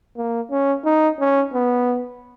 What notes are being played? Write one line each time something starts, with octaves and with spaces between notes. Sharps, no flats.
A#3
C#4
D#4
C#4
B3